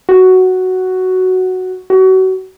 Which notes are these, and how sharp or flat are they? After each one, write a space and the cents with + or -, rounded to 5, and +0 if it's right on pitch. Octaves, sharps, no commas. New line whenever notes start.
F#4 +5
F#4 +30